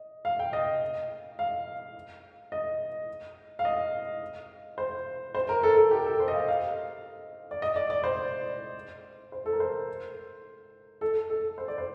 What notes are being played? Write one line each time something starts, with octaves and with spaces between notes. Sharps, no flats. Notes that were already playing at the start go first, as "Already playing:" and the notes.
Already playing: D#5
F5
G5
D#5
F5
D#5
F5
D#5
C5
C5
A#4
A4
A4
G4
A4
C5
D#5
F5
F5
D5
D#5
D5
D5
C5
C5
A4
A#4
C5
A4
A4
C5
D5
C5